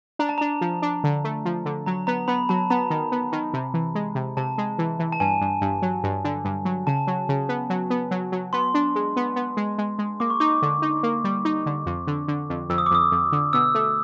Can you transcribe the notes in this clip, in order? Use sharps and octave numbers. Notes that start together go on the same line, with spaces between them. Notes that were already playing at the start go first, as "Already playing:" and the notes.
D4 A#5
A5
D4 A#5
F3
D4
D3
A3
F3
D3
F#3 A#5
B3 A#5
B3 B5
F#3 A5
B3 A#5
D#3
B3
D#3
C3
E3
G#3
C3
C3 A5
G#3
E3
E3
A5
G2 G#5
G2
G2
F#3
G2
D3
G2
F#3
C#3 A5
F#3
C#3
B3
F#3
B3
F#3
F#3
B3 C6
D4
G#3
B3
B3
G#3
G#3
G#3
A#3 D6
C#6
D#4 D6
D3
D#4
A#3
G3
D#4
D3
F2
D3
D3
F2
F2 E6
D#6
D6
F2 D#6
F2
D3
B2 E6
A3